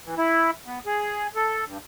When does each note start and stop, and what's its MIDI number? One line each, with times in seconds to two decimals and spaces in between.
0.05 0.15 52
0.18 0.51 64
0.66 0.79 59
0.86 1.27 68
1.36 1.65 69
1.66 1.78 43